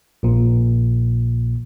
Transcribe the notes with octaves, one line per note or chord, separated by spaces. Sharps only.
A#1 A#2